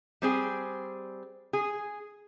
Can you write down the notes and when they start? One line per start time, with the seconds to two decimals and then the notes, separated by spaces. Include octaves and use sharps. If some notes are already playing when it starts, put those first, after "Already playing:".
0.22 G3 C4 G#4
1.53 G#4